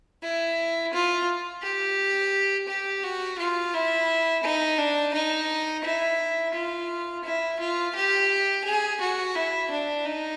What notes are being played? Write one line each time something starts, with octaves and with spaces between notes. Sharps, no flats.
E4
F4
G4
G4
F#4
F4
E4
D#4
D4
D#4
E4
F4
E4
F4
G4
G#4
F#4
E4
D4
D#4